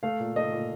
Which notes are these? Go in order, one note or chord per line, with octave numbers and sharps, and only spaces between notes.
A3 F5
A#2
A3 D#5
A#2